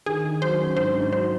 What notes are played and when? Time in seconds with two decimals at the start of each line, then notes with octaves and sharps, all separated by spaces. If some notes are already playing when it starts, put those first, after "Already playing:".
0.06 D#3 G#4
0.24 D#3
0.42 F#3 C5
0.60 C#4
0.77 G#2 C5
0.95 G#2
1.12 F#3 C5